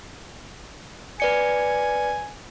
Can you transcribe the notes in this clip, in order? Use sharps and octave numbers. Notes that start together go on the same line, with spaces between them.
B4 D5 G#5 C#7